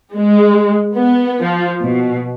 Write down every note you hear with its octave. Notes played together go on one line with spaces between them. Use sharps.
G#3
B3
F3
B2